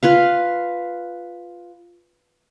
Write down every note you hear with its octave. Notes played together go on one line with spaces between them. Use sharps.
F4 B4 F5